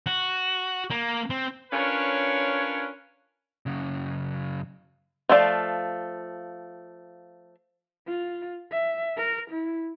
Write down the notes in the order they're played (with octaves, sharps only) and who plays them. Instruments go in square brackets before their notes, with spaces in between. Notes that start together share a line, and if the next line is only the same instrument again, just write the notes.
[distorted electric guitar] F#4
A#3
C4
[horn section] C#4 D4 F4 A#4 B4 C#5
[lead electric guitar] F#2 C#3
[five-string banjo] F3 A3 F4 G#4 D5
[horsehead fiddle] F4
E5
A#4
E4